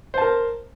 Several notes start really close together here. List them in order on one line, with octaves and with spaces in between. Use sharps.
C5 A5 A#4